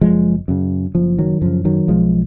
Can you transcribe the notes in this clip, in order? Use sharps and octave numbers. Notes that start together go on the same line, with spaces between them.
F#1 F3 G#3
F#2 C#3
F#1 F3
D#3 F#3
F#2 C#3 F3
D#3 F#3
B1 F3 G#3